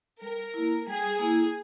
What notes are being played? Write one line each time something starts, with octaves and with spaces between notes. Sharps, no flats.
G3 A#4
A#3 E4
G3 G#4
A#3 E4